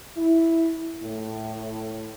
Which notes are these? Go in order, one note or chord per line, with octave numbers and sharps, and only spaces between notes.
E4
A2